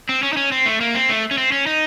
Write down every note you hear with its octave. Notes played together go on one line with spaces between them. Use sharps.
C4
C#4
D#4
C#4
C4
A3
A#3
C4
A3
C#4
C4
C#4
D#4